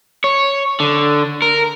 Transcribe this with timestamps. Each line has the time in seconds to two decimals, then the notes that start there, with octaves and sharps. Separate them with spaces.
0.24 C#5
0.80 D3
1.42 A#4